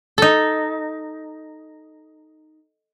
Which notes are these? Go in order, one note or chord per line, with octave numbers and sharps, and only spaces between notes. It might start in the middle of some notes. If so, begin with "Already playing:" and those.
D#4 A4